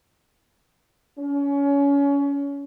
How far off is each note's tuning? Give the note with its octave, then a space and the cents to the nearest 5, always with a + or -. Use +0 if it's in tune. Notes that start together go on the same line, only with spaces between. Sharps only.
C#4 +25